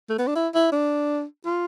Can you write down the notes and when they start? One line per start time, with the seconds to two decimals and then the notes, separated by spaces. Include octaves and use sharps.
0.10 A3
0.19 B3
0.28 D4
0.36 E4
0.55 E4
0.72 D4
1.45 F4